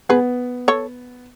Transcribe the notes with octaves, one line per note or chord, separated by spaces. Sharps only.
B3 G#4 B4
A4 C#5